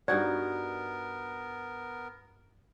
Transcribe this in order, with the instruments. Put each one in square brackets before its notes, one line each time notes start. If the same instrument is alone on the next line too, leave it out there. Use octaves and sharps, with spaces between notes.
[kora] G2 D#4 F#4 [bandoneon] B3 A#4 [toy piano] D5